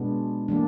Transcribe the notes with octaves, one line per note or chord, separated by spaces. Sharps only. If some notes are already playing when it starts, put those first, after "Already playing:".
Already playing: B2 G#3 B3 D4
E3 G3 A#3 D4